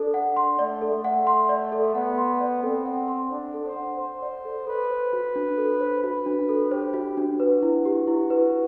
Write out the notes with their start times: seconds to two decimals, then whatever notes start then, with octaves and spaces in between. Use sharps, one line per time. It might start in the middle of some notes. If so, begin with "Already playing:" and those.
Already playing: D4 A4 D5
0.14 F#5
0.36 C6
0.59 A3 D5
0.82 A4
0.93 A3
1.04 F#5
1.27 C6
1.49 D5
1.72 A4
1.95 B3 F#5
2.18 C6
2.40 D5
2.63 C4 A4
2.86 F#5
3.08 C6
3.31 D4 D5
3.54 A4
3.65 C5
3.76 F#5
3.99 C5 C6
4.22 D5
4.45 A4
4.67 A4 B4
4.90 C5
5.13 F#4
5.36 D4
5.58 A4
5.80 C5
6.04 F#4 B4
6.26 D4
6.49 A4
6.71 G4 C5
6.94 F#4
7.17 D4
7.40 F#4 B4
7.62 E4
7.85 G4
8.07 E4 F#4
8.30 B4